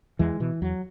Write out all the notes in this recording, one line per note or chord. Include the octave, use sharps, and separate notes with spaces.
E2 E3 G#3
B2 E3
E2 F#3